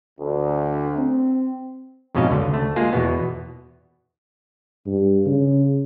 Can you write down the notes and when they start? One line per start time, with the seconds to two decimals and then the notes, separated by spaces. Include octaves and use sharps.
0.20 D2
0.98 C4
2.15 F2 G#2 B2 C#4 D#5 F5
2.30 C#2 D3
2.51 D2 A3
2.76 G#3 A#3 F4 G#4
2.93 E2 B2 B3
4.86 G2
5.26 C#3